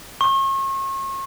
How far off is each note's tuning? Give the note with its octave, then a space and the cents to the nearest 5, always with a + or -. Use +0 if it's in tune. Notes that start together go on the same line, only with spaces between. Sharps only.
C#6 -40